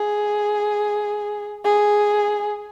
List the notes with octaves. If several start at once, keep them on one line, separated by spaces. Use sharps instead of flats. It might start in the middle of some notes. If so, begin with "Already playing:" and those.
Already playing: G#4
G#4